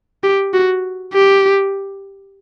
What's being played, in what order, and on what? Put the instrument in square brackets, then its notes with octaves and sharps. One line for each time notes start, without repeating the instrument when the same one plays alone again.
[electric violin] G4
F#4
G4